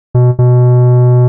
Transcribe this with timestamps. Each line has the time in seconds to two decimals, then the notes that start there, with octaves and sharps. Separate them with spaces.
0.14 B2
0.39 B2